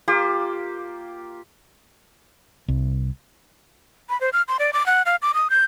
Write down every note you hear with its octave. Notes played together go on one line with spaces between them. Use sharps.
A#3 F4 G4
C2
B5
C5
F6
C6
D5
D6
F#5
F5
D6
D#6
G6